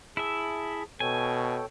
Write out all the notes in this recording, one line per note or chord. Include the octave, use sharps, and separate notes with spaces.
E4 G#4 E5 A5
B2 A4 C#5 G5 G#5